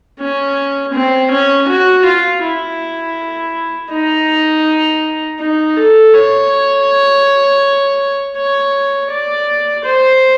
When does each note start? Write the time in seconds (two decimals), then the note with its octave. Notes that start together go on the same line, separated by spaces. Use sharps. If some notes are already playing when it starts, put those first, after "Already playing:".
0.19 C#4
0.93 C4
1.31 C#4
1.68 F#4
2.05 F4
2.42 E4
3.91 D#4
5.40 D#4
5.77 A4
6.13 C#5
8.36 C#5
9.11 D5
9.85 C5